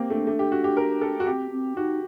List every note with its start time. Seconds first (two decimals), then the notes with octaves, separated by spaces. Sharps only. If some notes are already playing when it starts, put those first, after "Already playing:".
Already playing: A#3 C4 G4
0.10 A3 D4
0.27 A3
0.39 G4
0.52 F#4
0.64 G4
0.77 A#4
1.01 A4
1.20 F#4
1.27 C4 G4
1.51 C4
1.76 D#4 F#4